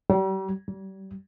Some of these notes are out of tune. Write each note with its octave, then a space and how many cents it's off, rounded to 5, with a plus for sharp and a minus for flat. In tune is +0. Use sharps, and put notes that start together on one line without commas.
G3 -40
G3 -35